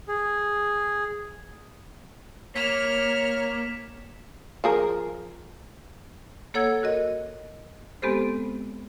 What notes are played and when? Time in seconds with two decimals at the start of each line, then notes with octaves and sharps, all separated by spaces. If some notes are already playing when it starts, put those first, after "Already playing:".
0.08 G#4
2.55 A#3 C#5 F6 B6 E7
4.64 F3 G#4 A#4
6.54 A#3 A4 C#5 F#5 E6 G#6
6.83 F#4 A#4 D#5
8.02 G#3 B3 C4 G4 A4 C5